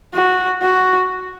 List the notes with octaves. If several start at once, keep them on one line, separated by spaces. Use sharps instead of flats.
F#4
F#4